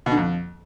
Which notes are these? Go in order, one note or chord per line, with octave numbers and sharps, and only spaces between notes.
B2
D3
F2